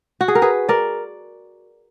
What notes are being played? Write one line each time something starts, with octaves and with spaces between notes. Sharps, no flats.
F#4
G#4
A#4
G#4 B4
A#4 D5